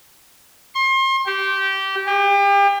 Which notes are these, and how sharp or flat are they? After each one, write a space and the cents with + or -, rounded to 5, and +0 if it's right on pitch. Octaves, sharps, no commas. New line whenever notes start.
C6 +35
G4 -20
G4 +35